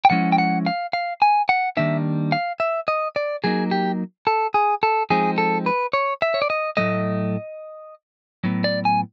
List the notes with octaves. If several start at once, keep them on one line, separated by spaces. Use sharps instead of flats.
G5
F3 G#3 C#4 E4 F#5
G5
F#5
F5
F5
G#5
F#5
D#3 G3 A#3 D4 E5
F5
E5
D#5
D5
F#3 A#3 D#4 G#4
G4
A4
G#4
A4
F3 G#3 C4 D#4 G#4
A4
B4
C#5
E5
C#5
D5
D#5
A2 F#3 A3 D#5
A2 F#3 B3
D5
G#5